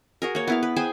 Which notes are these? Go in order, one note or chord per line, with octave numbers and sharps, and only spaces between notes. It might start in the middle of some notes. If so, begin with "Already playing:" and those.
F#4 G#4 A#4
A#3 C#5
B3 E4 F5
B4
G#4 C5 G5 G#5